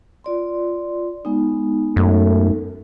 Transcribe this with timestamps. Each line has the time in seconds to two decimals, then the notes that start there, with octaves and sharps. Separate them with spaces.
0.24 F4 D5 C6
1.25 G#3 B3 D#4
1.96 F#2 A3